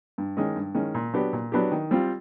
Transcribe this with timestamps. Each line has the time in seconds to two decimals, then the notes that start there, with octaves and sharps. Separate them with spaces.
0.18 G2
0.37 D#3 G#3 C#4
0.56 G2
0.75 D#3 G#3 C#4
0.94 A#2
1.14 F#3 B3 D4 G4
1.33 A#2
1.52 F#3 B3 D4 G4
1.72 D#3
1.91 G3 C4 F4